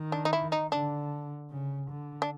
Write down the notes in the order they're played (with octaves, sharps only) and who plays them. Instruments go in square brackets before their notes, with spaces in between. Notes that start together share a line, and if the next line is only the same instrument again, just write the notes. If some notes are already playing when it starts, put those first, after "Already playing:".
Already playing: [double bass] D#3
[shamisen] D4
D#4
E4
D#4
[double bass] D3 [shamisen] D4
[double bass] C#3
D3
[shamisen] D4